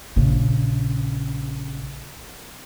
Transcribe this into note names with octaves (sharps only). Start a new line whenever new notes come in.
A#1 C#3